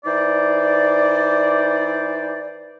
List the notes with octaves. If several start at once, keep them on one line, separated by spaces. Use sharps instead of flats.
E3 D#4 C5 D5